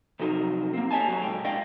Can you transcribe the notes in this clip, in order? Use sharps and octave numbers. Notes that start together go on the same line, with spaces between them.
C3 F3 F#3 D#4 A#4
A#3 C4
G4 C#5 D#5 G#5 A5
B1 G#2 F#3 C#5 G#5
A#2 C#3 G#3 G5
D4 E4 D5 D#5 F5 G5